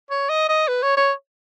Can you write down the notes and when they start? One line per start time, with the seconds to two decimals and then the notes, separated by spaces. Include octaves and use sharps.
0.10 C#5
0.29 D#5
0.49 D#5
0.68 B4
0.82 C#5
0.97 C#5